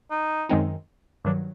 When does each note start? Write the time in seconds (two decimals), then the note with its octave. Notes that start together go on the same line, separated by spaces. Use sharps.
0.11 D#4
0.49 F#2 D#3 G#3 C4 D#4
1.25 G2 D#3 F#3 D4